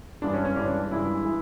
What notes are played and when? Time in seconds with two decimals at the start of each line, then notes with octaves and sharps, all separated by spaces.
0.22 G2 E3 G#3 D4
0.33 C#4
0.45 C#4
0.56 G2 E3 G#3 D4
0.91 G2 E3 G#3 E4
1.25 E3 G#3